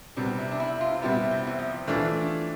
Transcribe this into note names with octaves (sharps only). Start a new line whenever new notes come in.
C3 G3 B3 D4
E4
D4
E4
F4
C3 G3 B3 E4
C4
E3
F3
E3 A3 D4 F4